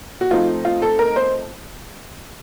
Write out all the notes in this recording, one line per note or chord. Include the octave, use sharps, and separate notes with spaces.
F#4
F3 A3 C4 D#4 F4
F4
A4
A#4
C5